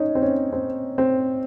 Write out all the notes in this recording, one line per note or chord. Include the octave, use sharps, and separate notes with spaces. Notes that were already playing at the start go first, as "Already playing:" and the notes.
Already playing: C#4 D#4
C4
C#4
C4
C4